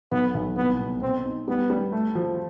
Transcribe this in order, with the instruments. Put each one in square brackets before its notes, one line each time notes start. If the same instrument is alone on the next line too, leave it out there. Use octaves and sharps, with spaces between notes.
[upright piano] B1 [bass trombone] B3
[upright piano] B1
[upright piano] C2 [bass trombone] B3
[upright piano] B2
[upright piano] B2 [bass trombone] C4
[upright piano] D#4
[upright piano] G3 [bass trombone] B3
[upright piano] G3
A3
F3